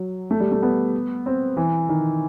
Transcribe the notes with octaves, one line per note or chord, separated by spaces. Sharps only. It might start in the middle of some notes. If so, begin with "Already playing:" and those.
Already playing: F#3
A3
G3
A3
B3
C4
E3
D#3